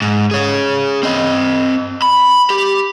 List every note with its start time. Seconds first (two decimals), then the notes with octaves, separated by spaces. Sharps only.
0.02 G#2
0.31 G#4 C#5
1.03 C4 D#5
2.02 B5
2.50 G4